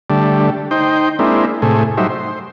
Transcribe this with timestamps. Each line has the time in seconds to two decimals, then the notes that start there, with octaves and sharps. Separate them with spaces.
0.10 D3 G3 A3
0.71 D#4 C5 G5
1.19 G#3 A#3 C4 D4 E4
1.62 A2 C3 A3 G#4
1.97 F#3 G3 D#4 C5 E5
2.10 C5